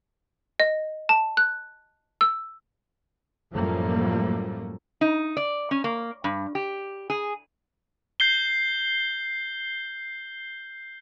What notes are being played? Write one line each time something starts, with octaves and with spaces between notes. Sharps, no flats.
D#5
A5
F#6
E6
F#2 A2 F3 G3 A3 A#3
D#4
D5
C#4
A#3
G2
G4
G#4
G6 C7 G7